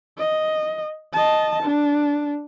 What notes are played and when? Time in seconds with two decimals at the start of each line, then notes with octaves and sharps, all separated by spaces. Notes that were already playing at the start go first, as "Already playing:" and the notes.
0.17 D#5
1.13 D#5 A5
1.63 D4